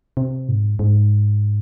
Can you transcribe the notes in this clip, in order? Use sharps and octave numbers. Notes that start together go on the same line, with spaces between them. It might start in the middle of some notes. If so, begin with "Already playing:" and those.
C3
G#2
G#2